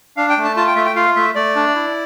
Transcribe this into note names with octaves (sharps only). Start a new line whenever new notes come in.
D4 F5
G5
A3
A5
F4 A5
G5
A3 E5
G5
F4 F5
A3 E5
A3 D5
D4
E4